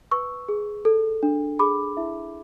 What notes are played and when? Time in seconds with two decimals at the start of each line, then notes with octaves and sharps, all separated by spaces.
0.11 B4 C#6 E6
0.49 G#4
0.85 A4
1.23 D4
1.59 G#4 B5 D6
1.97 E4 E5